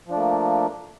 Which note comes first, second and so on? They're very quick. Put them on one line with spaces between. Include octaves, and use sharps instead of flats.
F3 D4 A3 A#3